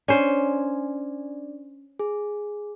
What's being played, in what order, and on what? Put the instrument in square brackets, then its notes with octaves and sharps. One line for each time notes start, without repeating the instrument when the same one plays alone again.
[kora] C#4 C5 [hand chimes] D4 D5
[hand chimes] G#4